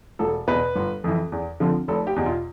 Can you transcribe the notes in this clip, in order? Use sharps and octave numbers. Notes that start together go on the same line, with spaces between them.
E1 A4
E2 B2 B4
G1
F2 E3
E2
D3 F3 C4
F1 A4
G4
E2 B2
F4